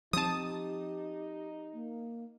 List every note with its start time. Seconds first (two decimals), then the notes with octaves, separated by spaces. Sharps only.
0.13 F3 C4 D#4 G4 A5 D#6
1.73 A#3